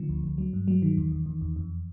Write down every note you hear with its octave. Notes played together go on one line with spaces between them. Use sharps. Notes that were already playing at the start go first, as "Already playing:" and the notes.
Already playing: D3 F3
D2
D2
F#3
G2
F#3
D#3
E2
E2
E2
E2
F2